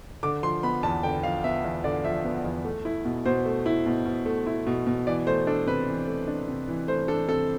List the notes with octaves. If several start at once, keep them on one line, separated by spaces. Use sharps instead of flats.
D3 D6
F3 C6
B3 B5
E2 A5
D3 G5
F3 F5
B3 E5
E2
D3 D5
F3 E5
B3
E2
A3
E4
B2
B2 C5
A3
E4
B2
B2
A3
E4
B2
B2
E3 D5
A3 C5
D4 A4
C3 B4
E3
A3
D4
C3
E3
A3 C5
D4 A4
C3 A4